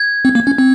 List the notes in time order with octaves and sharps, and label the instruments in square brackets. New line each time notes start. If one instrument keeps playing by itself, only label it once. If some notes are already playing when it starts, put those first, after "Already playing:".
Already playing: [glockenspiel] G#6
[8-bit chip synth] C4
A#3
C#4
C4